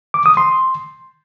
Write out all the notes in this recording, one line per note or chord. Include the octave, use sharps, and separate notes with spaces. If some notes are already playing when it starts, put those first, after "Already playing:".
D6
D#6
C6